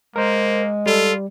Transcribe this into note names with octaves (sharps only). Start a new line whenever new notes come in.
G#3 A#3 A#4 C5
G3 F4 A4